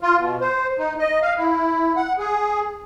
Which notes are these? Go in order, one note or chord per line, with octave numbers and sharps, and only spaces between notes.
F4
B2
C5
D#4
D#5
F5
E4
F#5
G#4